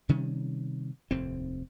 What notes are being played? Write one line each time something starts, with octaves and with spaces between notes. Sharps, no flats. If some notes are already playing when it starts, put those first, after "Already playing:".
C3 D#3 G3 C#4
F1 D#2 A2 C4